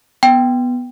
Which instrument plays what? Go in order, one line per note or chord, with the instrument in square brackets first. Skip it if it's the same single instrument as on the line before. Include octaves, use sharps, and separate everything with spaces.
[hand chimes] B3 [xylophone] G5